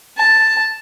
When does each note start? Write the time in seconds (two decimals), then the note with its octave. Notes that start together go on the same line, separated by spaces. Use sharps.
0.17 A5